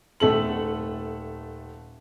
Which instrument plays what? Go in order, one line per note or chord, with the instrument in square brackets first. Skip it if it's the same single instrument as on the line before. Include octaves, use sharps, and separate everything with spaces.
[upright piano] D#1 A3 A4 F#7